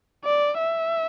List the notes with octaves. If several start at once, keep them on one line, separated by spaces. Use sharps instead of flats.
D5
E5